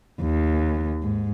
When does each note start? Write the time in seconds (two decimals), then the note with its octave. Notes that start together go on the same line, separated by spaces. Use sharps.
0.22 D#2
1.02 G#2